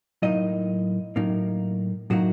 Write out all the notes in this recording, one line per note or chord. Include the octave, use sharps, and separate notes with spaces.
A2 F#3 A#3 D#4 D#5
A2 F#3 A#3 D#4
A2 F#3 A#3 D#4 F#4